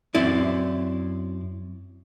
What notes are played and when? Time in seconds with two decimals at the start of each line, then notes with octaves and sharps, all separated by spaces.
0.14 F#2 C4 E4 D5